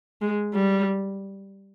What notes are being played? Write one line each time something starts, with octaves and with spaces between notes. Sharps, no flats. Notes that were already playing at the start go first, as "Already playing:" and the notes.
G#3
G3